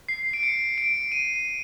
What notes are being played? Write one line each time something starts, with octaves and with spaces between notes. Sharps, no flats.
C7
D7
C#7
D7
D#7